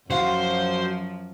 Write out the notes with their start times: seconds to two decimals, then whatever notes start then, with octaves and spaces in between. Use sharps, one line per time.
0.10 F#2 F3 F#4 C5 F5